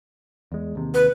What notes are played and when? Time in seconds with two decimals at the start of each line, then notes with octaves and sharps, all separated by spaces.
0.52 E2 G#3
0.75 D#2 C3
0.94 B4